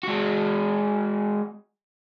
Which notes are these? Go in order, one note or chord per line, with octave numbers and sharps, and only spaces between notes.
G#3 F#4